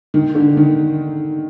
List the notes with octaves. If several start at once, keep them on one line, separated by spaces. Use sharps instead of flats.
D#3
D3
D#3